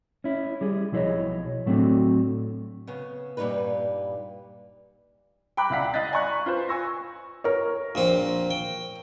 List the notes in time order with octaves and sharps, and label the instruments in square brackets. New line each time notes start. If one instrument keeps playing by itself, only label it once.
[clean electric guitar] C#4 E4
G3 G#4
B1 F3 E4 C5 C#5 D#5
A2 F#3 A3 C4 D4 F#4
[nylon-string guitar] C#3 B3 C#4
G2 A#2 C#3 G3 D#4 B4
[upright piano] G5 A#5 B5 D6 F#6
C#2 E4 D5 F5 F#5 B6
D#5 F5 F#6 A6 B6
D5 G#5 A#5 C#6 F#6
F4 B4 C5
G#5 C#6 E6 A#6
[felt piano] A#4 C#5
[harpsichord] A#1 A#2 C4
G5